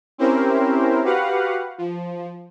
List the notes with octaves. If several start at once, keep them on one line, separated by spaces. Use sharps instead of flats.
C4 C#4 E4 G4 A#4 C5
F#4 G4 B4 F5 F#5
F3